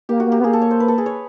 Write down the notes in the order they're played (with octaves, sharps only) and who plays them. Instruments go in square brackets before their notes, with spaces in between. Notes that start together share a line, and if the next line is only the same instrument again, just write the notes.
[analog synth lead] A#3 [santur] G4
[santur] F#4
[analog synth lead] A#3
[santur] G4
[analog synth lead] B3
[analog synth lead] A#3 [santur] G#4
[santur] A4
C#5
C5
B4
A4
G#4
C#5